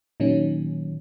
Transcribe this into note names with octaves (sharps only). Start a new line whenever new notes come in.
A#2 D#3 F#3 C#4